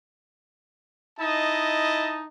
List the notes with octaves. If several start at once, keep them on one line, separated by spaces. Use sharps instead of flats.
D#4 E4 D#5 A5